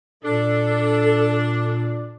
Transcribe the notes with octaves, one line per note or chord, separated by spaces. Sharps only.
A#2 D4 A4